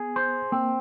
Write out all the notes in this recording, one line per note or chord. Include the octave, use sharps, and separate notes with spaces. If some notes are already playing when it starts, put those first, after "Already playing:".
Already playing: B3 G#4
C5
A#3 C4